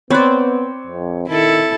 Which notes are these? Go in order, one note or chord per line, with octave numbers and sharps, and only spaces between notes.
B3 C4 C#5 D5 B5 F#6
F2
D#3 E4 A4